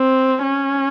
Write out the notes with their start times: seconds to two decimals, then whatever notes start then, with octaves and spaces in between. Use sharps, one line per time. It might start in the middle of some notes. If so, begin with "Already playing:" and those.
Already playing: C4
0.42 C#4